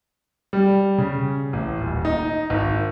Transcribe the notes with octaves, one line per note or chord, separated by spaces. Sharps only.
G3
C#3
A1
D#1
D#4
G#1